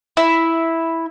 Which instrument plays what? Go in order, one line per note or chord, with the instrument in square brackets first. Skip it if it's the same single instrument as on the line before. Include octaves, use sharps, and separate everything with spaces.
[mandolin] E4